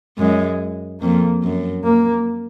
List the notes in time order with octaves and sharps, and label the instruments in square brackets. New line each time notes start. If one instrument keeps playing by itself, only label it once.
[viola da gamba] F#2 [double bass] G#3
[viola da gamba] F2 [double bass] A#3
[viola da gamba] F#2
[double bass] A#3